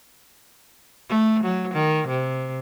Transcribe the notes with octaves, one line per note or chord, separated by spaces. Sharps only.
A3
F#3
D#3
C3